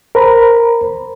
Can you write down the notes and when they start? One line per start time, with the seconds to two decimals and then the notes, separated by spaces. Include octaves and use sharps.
0.15 A#4 C5 A#5 B5